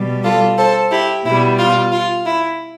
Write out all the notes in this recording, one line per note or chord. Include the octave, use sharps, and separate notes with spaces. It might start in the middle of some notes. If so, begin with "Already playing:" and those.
Already playing: B2 G3
F4 A4
A4 C5
E4 G4
B2 G3 E4
F4
F4
E4